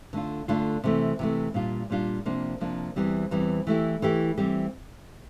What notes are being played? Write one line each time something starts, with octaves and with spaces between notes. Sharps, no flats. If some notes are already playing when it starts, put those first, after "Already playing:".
D3 A3 D4 F4
D3 A3 D4 F4
C3 E3 A3
C3 E3 A3
A#2 G3 D4 F4
A#2 G3 D4 F4
C3 F3 A#3 D4
C3 F3 A#3 D4
E2 E3 G3 C4
E2 E3 G3 C4
E3 A3 E4 G4
E3 A3 E4 G4
E3 G3 C4 G4